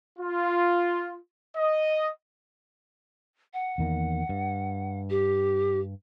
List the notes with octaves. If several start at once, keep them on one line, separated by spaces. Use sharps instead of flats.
F4
D#5
F#5
E2 D#3 A#3
G2
G4